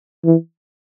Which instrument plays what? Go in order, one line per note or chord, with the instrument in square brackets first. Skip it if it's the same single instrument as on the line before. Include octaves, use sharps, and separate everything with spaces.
[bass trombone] E3